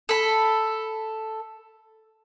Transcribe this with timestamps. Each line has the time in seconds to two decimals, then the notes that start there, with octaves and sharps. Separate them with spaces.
0.09 A4 B5